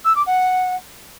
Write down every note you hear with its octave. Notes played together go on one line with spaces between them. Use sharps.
E6
D6
F#5